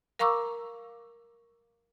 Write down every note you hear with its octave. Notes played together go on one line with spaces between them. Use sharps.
A#4 F5 A#5 C#6 D6 E6